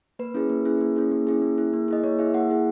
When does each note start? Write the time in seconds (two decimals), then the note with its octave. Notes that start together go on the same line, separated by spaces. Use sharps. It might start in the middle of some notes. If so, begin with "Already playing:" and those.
0.19 A#3 B4
0.34 C#4 E4 G#4
0.50 A#3
0.65 C#4 E4 G#4
0.81 A#3
0.96 C#4 E4 G#4
1.12 A#3
1.27 C#4 E4 G#4
1.42 A#3
1.58 E4 G#4
1.73 A#3
1.88 E4 G#4 D#5
2.04 A#3 C#5
2.19 E4 G#4 E5
2.34 A#3 F#5
2.50 E4 G#4